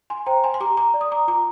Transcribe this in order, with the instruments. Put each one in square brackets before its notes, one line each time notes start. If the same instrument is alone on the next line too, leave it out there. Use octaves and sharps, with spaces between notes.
[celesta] G#5 C6
C5 G5 A#5
G#5 C6
C6
G4 A#5 D6
A#5 D6
D5
D#6
A#5 D6
F4 A#5 D6